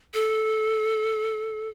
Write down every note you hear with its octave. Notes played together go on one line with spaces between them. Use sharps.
A4